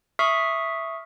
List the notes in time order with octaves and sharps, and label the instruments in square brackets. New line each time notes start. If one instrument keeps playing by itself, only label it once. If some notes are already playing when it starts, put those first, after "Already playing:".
[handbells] E5 C#6 D#6 F6 B6 C7